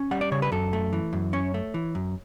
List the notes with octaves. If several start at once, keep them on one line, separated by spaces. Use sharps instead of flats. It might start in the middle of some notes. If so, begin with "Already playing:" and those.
Already playing: C#4
G3 F#5
D5
C#3 C#5
B4
F#2 A4
A3
E3
F#2
C#4 C#5
A3
E3
F#2